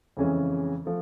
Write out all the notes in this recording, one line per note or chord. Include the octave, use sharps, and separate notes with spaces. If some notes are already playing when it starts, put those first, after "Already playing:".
F2 C#3 E3 G#3 C#4
F3 A3